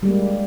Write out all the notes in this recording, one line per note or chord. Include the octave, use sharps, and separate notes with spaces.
G3 G#3 A#3